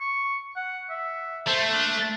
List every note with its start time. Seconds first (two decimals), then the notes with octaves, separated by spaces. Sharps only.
0.01 C#6
0.56 F#5
0.90 E5
1.47 A3 C5
1.71 D4